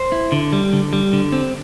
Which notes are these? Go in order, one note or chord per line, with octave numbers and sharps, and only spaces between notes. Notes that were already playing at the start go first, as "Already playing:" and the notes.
Already playing: C5
E4
D3
G3
D3
G3
D3
C4